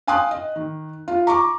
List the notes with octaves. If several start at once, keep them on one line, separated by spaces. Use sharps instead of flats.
F5 G5 G#5 C6 D#6 F#6
D#5
D#3
F4
A#5 C#6 D6